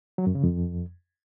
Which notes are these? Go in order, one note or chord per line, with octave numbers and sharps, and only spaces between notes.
F#3
F#2
C#3
F2